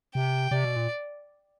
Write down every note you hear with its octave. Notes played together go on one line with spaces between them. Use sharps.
C3 G5
C3 D5
B2
A#2